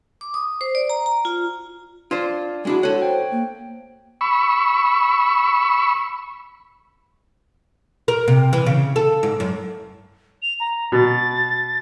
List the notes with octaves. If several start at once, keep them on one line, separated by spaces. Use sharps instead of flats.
D6
D#6
C5
D5
A#5
A#5
F4
D4 F4 C5 D5
G#3 D4 E4 F#4
A4 C#5 F#5
C5 G5
A#3
B5 C#6 E6
A#4
C3
E3
C#3
A4
G#2
F#2
F7
A#5
B2 A6